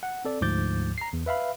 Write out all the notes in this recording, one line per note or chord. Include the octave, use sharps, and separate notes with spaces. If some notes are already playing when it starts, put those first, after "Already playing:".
F#5
C4 A4 D5
D2 G#2 F3 D6 G6 A6
A#5 C7
E2
B4 E5 F5 B5